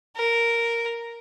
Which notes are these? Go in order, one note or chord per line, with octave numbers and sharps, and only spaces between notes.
A#4